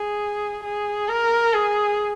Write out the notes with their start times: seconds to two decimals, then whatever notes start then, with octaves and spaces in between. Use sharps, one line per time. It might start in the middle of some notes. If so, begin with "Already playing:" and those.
Already playing: G#4
0.64 G#4
1.08 A#4
1.53 G#4